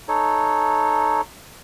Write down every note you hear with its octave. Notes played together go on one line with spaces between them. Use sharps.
D#4 A4 C#5